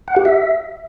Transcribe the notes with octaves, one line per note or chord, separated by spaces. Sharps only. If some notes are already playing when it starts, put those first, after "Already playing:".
F#5
G4
E5